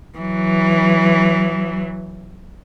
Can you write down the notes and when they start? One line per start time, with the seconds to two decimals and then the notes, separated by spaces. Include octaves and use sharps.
0.18 E3 F#3